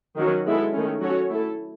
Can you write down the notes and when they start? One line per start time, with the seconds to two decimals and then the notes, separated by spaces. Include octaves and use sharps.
0.17 D#3 F#3 C#4 F#4
0.45 G#3 B3 E4 A4
0.73 D#3 A3 C#4
1.01 F#3 C#4 F#4 A4 C#5
1.29 A3 E4 A4